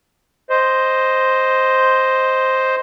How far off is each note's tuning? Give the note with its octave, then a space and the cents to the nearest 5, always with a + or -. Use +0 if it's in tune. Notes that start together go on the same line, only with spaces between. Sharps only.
C5 +0 D#5 +0